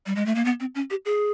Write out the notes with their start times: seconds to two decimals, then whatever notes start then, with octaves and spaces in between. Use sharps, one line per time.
0.06 G3
0.16 G#3
0.26 A3
0.35 A#3
0.45 B3
0.60 C4
0.75 C#4
0.90 G4
1.05 G#4